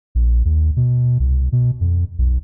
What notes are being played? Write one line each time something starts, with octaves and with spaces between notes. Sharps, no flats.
A#1
D#2
B2
C2
B2
F2
B1